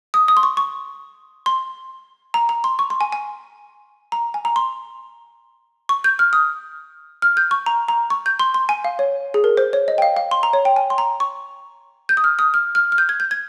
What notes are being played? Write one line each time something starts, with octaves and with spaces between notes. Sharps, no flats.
D#6
D#6
C6
C#6
C#6
C6
A#5
A#5
C6
C#6
C6
G#5
G#5
A#5
G#5
A#5
C6
C#6
G6
F6
D#6
F6
G6
C#6
A#5
A#5
C#6
G6
C6
C6
G#5
F5
C#5
G#4
A#4
C5
C#5
D#5
G5
F5
F5
C6
A#5
C#5
G5
G#5
C6
A#5
C#6
G6
D#6
F6
D#6
F6
F6
F6
G6
G#6
G6
G#6